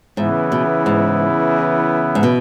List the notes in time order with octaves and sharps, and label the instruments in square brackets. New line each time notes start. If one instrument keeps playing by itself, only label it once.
[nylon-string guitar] G#2 [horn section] C#3 E3 B3 E4
[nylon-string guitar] B2
G#2
G#2
B2